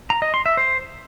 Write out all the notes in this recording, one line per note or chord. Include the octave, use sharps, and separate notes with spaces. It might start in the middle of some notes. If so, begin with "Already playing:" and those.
A#5
D#5
C6
E5
C5